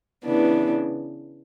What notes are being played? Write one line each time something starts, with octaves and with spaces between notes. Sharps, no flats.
C#3 E3 B3 D4